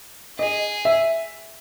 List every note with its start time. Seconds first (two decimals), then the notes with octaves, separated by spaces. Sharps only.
0.39 G#4 D#5
0.85 E5